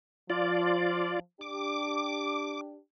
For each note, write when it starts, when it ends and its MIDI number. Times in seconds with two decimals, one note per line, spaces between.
0.30 1.19 53
0.30 1.19 65
0.30 1.19 74
1.41 2.78 62
1.41 2.78 67
1.41 2.61 86